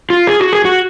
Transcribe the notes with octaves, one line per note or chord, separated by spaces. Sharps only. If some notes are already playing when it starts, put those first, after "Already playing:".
F4
G#4
F#4
G#4
F#4